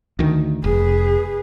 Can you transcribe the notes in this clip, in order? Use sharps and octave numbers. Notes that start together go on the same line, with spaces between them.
D2 D#3
F1 G#4 B4